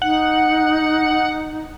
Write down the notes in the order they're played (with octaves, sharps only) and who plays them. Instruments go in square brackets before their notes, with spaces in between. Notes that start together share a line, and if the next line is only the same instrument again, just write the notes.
[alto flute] D#4 [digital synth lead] F#5